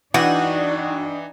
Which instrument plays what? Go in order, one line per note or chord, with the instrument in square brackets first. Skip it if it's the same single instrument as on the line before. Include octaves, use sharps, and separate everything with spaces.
[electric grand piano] E3 [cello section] D4 D#4 [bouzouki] F#4 [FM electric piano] D5 G5 D#6